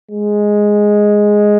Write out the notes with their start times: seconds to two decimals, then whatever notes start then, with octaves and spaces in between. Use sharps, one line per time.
0.11 G#3